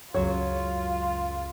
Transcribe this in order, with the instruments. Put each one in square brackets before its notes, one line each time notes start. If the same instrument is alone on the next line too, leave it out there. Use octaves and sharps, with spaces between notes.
[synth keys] C#2 F#2 [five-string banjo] F#3 C#5 [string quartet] F4